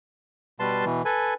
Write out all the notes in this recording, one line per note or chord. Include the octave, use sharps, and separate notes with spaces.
B2 G3 B4 A5 C6
B2 E3
A4 B4 G#5